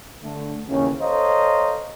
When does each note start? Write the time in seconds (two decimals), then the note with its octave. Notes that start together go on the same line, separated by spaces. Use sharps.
0.23 D3 A3
0.68 G1 D#2 C#3 E3 C#4
1.02 A4 C5 C#5 D#5 F5 A#5